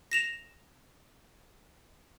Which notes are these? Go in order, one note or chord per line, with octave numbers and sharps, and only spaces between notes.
A#6 E7 F7